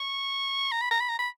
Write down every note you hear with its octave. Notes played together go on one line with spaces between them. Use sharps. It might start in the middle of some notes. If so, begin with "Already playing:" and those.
Already playing: C#6
A#5
B5
A#5
B5
A#5
B5